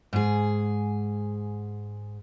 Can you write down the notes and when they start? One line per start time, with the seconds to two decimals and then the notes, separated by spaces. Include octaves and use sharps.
0.13 G#2 G#4